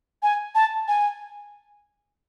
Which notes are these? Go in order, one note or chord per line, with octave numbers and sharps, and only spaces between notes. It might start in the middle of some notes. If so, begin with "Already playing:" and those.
G#5
A5
G#5